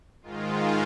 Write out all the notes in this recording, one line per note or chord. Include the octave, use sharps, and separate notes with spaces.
G#2 D#3 G#3 F4